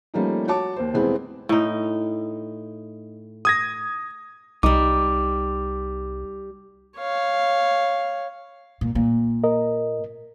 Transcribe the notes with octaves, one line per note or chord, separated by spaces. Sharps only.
F3 G3 A3 A#3 C#4 D#4
F#4 C#5 A5 D6
D#2 C5
F1 E3 G#3 B3 C4 G#4
A2 D#4
D#6 G#6 A#6
C2 G3 D#4 D6
C#5 F5
A#2
A#2
A#4 D#5